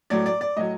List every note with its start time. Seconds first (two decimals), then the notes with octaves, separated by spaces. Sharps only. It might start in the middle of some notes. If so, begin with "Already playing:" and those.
0.10 A2 F#3 D5
0.26 D5
0.41 D5
0.57 A2 F#3 D#5